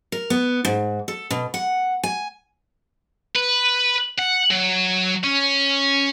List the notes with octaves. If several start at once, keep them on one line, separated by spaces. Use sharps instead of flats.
A#4
B3
G#2
A4
B2
F#5
G#5
B4
F#5
F#3
C#4